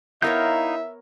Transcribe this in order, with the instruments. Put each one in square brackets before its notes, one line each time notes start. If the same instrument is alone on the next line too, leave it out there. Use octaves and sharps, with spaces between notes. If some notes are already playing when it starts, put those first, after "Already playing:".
[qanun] B3 A#4 C#5 [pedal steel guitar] D#4 F5 G6 [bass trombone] E4 [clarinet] E5